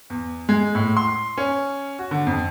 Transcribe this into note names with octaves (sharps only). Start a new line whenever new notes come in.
E2
G#3
A2
C6
C#4
F#4
D3
F2